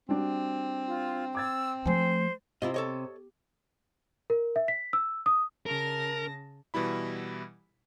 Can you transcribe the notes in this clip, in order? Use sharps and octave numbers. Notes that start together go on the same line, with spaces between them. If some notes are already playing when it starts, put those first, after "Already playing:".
G3 C4 D4 F#4
F4
D6 E6 G#6 A6
F3 A3 C5 G#5
C3 E4 F4 D#5
A4 C#5 D#5
A#4
E5
B6
E6
D#6
C#3 A#4 A5 A#6
B2 E3 G3 E4 B5